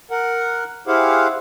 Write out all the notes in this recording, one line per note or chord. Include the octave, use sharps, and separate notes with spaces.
A#4 F#5
E4 G4 G#4 C5 F5 F#5